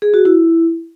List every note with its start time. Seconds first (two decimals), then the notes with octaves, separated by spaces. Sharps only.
0.02 G#4
0.14 F#4
0.25 E4